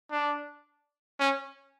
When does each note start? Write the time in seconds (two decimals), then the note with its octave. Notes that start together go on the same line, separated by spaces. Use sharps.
0.12 D4
1.20 C#4